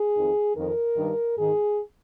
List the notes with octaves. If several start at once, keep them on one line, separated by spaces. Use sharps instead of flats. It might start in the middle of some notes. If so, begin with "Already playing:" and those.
Already playing: G#4
F2 D#3
F2 D#3 A#4
G2 D#3
G#2 D#3 G#4